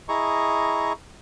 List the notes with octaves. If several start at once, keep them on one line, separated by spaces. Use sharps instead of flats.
E4 G#4 D#5 A#5 C#6